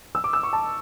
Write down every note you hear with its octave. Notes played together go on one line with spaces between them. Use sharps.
E6
D6
E6
C#6
A5